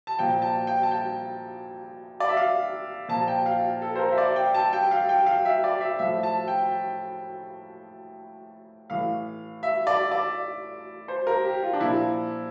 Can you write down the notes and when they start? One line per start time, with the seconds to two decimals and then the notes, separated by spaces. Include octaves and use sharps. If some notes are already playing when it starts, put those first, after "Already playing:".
0.07 A5
0.18 A#2 F3 G5
0.42 A5
0.67 G5
0.83 A5
0.91 G5
2.20 D5
2.29 E5
2.37 F5
3.08 A#2 F3 A5
3.28 G5
3.46 F5
3.82 A4
3.96 C5
3.99 A#4
4.12 E5
4.18 D5
4.36 G5
4.54 A5
4.73 G5
4.91 F5
5.09 G5
5.26 F5
5.45 E5
5.64 D5
5.81 E5
5.99 A2 F3 E5
6.23 A5
6.48 G5
8.90 A2 E3 F5
9.63 E5
9.87 D5
10.12 D5
11.08 C5
11.27 A#4
11.45 G4
11.63 F4
11.73 D4
11.80 A#2 F3 E4